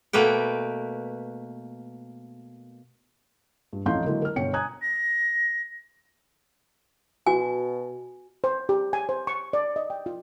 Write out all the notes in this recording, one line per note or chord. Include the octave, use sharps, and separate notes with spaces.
B2 A3 A#3 B4 G5
G2
A1 F2 D#4 F5 C6 G6
D3 F#3 G#3 A#3 E4
A#4 F6
G1 B2 C#5 G5 C#7
G#5 A#5 D#6 F#6 G#6
A#6
B2 F#4 G#5
C5
G4
G#5
C5
C#6
D5
D#5
G5
F4